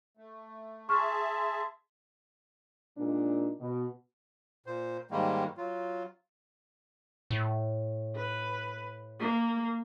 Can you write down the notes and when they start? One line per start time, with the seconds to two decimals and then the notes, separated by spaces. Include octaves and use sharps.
0.17 A3
0.89 G#4 E5 A5 C6 C#6 F6
2.97 A#2 G#3 D4 D#4
3.60 B2
4.66 A#2 C5
5.11 G#2 D#3 G3 G#3 A#3
5.57 F#3 F4
7.31 A2
8.16 B4
9.20 A#3